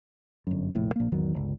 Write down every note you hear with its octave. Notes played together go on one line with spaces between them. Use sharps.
G1 F#2
F1 A#1 A2
A#1 A#3
G#1 E2 D#3 F#3
G1 C#2